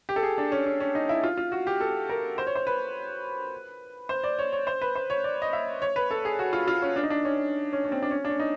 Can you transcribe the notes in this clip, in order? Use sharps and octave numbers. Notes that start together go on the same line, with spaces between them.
G4
A4
G#4
D4
C#4
C#4
C#4
D#4
E4
F4
F4
F#4
G4
A4
A#4
C5
C#5
C5
B4
C5
D5
C#5
C#5
C5
B4
C5
C#5
D5
D#5
E5
C#5
B4
A4
G#4
F#4
F4
F4
C#4
D4
D#4
D4
C#4
C#4
C#4
C4
D4
C#4
D4
C#4
D#4